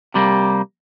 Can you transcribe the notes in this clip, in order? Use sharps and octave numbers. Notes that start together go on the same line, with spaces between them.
C3 G3 A3 A#3